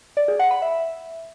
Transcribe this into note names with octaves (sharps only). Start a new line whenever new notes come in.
D5
G#4
F#5
B5
E5